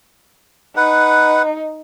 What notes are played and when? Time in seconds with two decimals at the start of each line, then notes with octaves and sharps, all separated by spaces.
0.77 D#4 B4 F#5